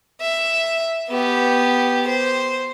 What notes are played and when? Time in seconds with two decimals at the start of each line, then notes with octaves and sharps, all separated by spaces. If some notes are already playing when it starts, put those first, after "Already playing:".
0.21 E5
1.09 B3 G4
2.08 C5